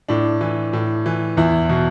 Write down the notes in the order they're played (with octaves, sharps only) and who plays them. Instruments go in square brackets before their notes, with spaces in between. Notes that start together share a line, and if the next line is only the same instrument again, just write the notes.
[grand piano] A2 D4
E3
A2
E3
E2 E4
B2